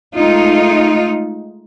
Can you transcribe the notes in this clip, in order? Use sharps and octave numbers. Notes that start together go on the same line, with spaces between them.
G#3 A3 D#4 F4